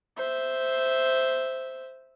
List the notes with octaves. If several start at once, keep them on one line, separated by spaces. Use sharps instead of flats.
C5 E5